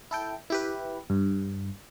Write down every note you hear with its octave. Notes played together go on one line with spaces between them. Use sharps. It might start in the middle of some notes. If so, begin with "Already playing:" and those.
E4 A4 G5
E4 G4 B4
G2